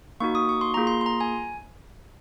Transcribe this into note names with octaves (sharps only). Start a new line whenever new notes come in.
A#3 D#4 F#4 C#6
D#6
C#6
C6
A#3 F4 G#4 A#5
C6
C6
A#5
G#5